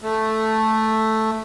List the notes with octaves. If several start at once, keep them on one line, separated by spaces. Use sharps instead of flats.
A3